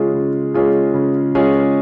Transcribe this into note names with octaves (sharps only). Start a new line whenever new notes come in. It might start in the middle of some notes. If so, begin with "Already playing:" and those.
Already playing: C#3 G#3 C#4 F4 G#4
C#3
G#3 C#4 F4 G#4
C#3
G#3 C#4 F4 G#4